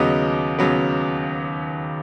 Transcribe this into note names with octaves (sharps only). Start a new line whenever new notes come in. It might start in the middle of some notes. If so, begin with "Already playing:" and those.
Already playing: D#2 C#3 F#3 B3 D#5
D#2 C#3 F#3 B3